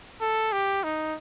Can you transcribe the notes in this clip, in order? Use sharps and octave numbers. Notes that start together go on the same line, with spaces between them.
A4
G4
D#4